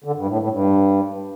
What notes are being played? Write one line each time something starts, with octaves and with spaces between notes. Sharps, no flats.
D3
G2
A2
A2
G2